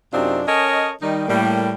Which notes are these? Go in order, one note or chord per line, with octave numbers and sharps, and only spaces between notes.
F#2 C3 C4 D4 D#4 F4
C#4 A4 A#4 C#5 D#5
D#3 G3 D#4
A2 G3 A#3